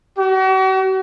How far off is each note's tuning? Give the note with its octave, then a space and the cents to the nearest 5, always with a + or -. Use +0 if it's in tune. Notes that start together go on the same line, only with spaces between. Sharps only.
F#4 +40